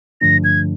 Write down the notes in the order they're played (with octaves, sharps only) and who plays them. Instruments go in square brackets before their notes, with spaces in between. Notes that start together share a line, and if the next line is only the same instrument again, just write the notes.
[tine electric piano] G2 D3 F3 A3 D4 [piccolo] A#6
[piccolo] G#6